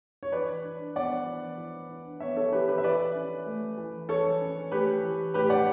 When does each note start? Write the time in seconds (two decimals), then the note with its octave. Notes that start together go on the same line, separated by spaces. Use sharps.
0.23 C#5
0.32 E3 B4 D5
0.64 D4
0.96 B3 D5 F#5
1.26 E3
1.58 E3
1.89 D4
2.20 B3 C#5 E5
2.36 A4 C#5
2.52 E3 G4 B4
2.68 G4 B4
2.78 E5
2.84 E3 B4 D5
3.15 C#4
3.46 A3
3.78 E3
4.09 E3 A4 C#5
4.41 C#4
4.71 A3 G4 B4
5.03 E3
5.34 A2 G4 B4
5.50 D5 F#5